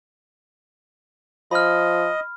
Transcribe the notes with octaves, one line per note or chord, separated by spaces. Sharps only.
F3 D#5 B5 F6